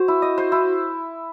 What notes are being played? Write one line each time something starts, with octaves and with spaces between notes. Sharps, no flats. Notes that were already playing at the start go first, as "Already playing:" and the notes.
Already playing: F#4 C5
E4
D#5
C5
E4